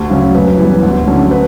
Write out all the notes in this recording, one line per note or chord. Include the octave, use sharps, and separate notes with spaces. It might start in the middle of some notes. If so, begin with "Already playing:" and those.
Already playing: D2 G4
C#3 F#3 C#4
F#2 B4
E3 G3 B3
D2
D3 F#3 C#4
B4